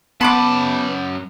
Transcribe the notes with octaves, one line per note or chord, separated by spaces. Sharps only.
F#2 B3 A5 B5 C6 D6